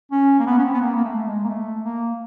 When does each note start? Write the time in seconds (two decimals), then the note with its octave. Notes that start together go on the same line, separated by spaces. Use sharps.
0.12 C#4
0.39 A#3
0.46 B3
0.58 C#4
0.65 C4
0.73 B3
0.82 A#3
0.97 A#3
1.04 A3
1.16 A3
1.27 G#3
1.44 A#3
1.49 A3
1.84 A#3